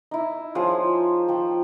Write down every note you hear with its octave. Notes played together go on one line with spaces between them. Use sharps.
D#4 E4
F3 G#4 C5 C#5
F3 G5